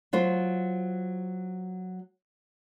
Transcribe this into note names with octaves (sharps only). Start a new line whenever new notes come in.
F#3 F4 C5